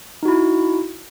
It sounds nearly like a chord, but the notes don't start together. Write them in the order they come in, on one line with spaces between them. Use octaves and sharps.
D#4 F#4 E4